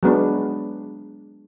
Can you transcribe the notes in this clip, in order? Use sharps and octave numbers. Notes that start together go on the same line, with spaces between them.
F#3 G#3 B3 D4